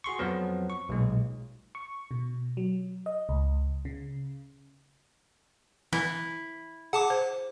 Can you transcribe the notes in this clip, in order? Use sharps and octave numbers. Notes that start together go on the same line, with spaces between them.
F#4 G#4 C6 C#6
F2 F3 F#3 B3
C#6
B1 A#2 G#3
C#6
B2
F#3
D#5
C#2
C#3
E3 E4
G#4 F#5 A5 D6
C5